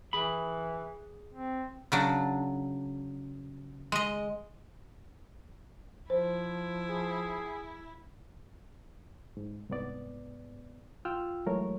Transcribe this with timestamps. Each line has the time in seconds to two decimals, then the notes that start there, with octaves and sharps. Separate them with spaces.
0.13 E3 G#4 B5
1.34 C4
1.92 C#3 F#3 D4
3.92 G#3 D#5
6.10 F3 E4 C5
6.89 G#4
9.37 G#2
9.69 C2 G#2 B3 D5
11.05 F4 G5 E6 F6
11.46 E3 F#3 G#3 A3 A#4 C#5